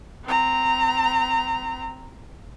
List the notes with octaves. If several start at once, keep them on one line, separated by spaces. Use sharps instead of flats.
C4 A#5